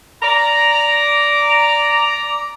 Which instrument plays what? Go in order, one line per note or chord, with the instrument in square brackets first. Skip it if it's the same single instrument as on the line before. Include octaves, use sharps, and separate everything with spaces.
[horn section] D5 A#5